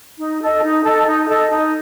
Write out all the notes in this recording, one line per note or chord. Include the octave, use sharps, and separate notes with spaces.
D#4
A4 D#5
D#4
A4 D#5
D#4
A4 D#5
D#4